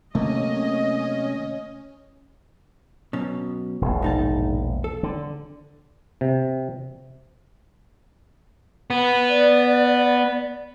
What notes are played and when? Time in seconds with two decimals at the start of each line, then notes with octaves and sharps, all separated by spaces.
0.15 C3 D#3 F#3 A3 A#3 C#4 D#5
3.13 B2 F#3 C#4
3.81 E1 A#1
4.02 G#2 D#4 A5
4.84 A4
5.03 D3
6.21 C3
8.90 B3
9.28 D5